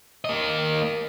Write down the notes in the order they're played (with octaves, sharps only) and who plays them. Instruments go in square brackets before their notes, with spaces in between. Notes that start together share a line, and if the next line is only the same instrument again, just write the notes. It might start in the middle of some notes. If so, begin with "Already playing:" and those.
[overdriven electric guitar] A#3 D#5